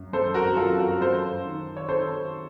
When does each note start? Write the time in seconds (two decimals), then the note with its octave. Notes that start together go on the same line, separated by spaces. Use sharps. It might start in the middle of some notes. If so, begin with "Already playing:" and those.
Already playing: F#2
0.13 F#2 A4 C5
0.34 F#4 A#4
0.56 F#2 F4 A4
0.78 F#4 A#4
1.01 F#2 A4 C5
1.45 D#3
1.77 C#5
1.89 D#3 A4 C5